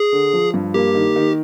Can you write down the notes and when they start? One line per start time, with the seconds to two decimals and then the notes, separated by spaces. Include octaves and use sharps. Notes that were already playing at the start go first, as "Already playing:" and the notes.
Already playing: G#4
0.12 D3
0.33 F3
0.54 G2
0.74 A#3 G4
0.95 D#3
1.16 D#3